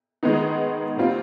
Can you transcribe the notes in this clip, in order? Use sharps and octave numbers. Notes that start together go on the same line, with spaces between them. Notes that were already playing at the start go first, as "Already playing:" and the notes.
D#3 G#3 B3 D#4
A#2 G3 C4 F4